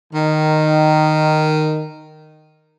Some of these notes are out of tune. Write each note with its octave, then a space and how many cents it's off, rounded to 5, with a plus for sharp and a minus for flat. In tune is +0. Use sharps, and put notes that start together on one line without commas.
D#3 -10